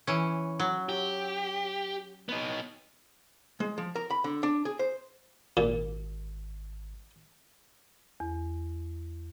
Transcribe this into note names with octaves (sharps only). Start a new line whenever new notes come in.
E3 C#4
F#3
G4
B3 D#4
G#3
F3
A#4
B5
D3
D4
G#4
C5
G#1 A#2
E2